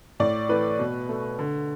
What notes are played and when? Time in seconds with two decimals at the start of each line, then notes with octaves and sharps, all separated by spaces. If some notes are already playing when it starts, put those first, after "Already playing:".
0.20 A2 D5
0.49 E3 A3 B4
0.79 B2
1.09 A3
1.39 D3